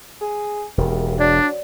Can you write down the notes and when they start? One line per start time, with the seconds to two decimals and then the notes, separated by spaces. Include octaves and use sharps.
0.21 G#4
0.78 E1 D#2
1.19 F#3 D4 D5